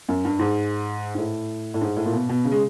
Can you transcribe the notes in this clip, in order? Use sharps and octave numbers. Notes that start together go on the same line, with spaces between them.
F#2
G2
G#2
G#2
A2
A2
G#2
A2
A#2
B2
B2
C#3
G#3